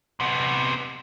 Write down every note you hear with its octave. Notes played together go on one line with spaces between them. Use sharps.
C3 B3